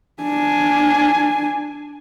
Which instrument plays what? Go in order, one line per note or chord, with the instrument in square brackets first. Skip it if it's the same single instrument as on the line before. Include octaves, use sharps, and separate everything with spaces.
[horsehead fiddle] D4 G#5